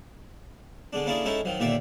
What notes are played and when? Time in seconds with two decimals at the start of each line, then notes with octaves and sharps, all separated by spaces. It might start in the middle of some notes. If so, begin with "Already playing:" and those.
0.93 D3 G#3 D4
1.06 A#3 C#4 D4 E4 G#4 A4
1.25 G#3 C#4 D#4 E4 A4
1.45 D#3 F3 F#3
1.60 D#2 A#2 D3 D5 E5